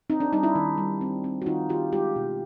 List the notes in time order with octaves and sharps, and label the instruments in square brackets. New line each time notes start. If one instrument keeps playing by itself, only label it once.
[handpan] C4 D#4
D4
G3 D#4
D4 E4
D#3
G3
C4
C4
F#4
D#3 D#4 F4
D#3 F4 G4
G#3 F4 G4
B2